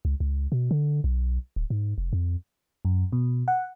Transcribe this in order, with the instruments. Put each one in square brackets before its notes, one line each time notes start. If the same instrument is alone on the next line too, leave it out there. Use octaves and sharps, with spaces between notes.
[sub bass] C#2
C#2
B2
D3
B1
D1
G#2
F1
F2
[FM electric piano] F#2
B2
F#5